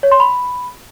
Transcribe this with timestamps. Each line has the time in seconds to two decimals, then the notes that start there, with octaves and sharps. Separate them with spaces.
0.03 C#5
0.12 C6
0.20 B5